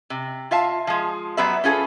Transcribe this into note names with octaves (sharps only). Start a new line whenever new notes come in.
C3
F4 E5 F5 A5
F3 G#3
F#3 G3 B3 B4 E5
C#4 F4 G#4 A4 B4